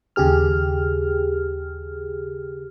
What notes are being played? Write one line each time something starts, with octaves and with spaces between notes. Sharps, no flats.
D#2 C#3 G4 G#4 F6